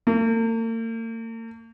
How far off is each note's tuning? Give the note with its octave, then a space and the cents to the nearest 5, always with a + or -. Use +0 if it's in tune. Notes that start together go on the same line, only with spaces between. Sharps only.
A#3 -45